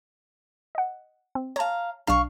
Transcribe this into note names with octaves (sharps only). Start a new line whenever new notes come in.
D#5 F#5
C4
C#5 F5 A5 A#5
B1 D4 F5 A5 C#6